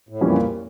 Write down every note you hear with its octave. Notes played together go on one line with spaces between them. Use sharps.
A2
F2 A#2 E3 G3 C#4